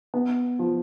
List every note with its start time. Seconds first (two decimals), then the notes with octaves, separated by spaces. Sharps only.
0.14 B3
0.59 F3